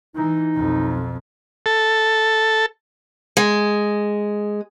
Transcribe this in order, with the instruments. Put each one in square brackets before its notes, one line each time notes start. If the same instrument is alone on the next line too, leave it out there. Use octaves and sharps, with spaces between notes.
[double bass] E3 [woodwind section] D#4
[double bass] B1 F2
[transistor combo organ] A4
[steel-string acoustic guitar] G#3